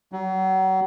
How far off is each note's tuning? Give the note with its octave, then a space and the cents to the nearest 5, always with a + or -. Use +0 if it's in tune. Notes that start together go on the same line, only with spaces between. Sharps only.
F#3 +35